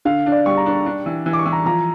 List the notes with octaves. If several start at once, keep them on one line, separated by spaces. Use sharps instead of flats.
D3 F5
D4
D5
G3 C#6
A#5
D4 C#6
D4
E3
E3
D6
C#6
E3
A#5
F3 A#5